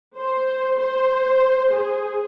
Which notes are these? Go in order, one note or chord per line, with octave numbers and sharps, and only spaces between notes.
C5
C5
G#4